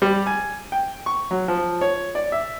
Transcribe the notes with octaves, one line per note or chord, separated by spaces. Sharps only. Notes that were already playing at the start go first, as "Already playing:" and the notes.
G3
G#5
G5
C#6
F#3
F3
C#5
D5
E5